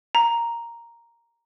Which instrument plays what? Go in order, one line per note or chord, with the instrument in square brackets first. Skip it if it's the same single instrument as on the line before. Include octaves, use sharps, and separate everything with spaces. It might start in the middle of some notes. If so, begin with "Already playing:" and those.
[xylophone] A#5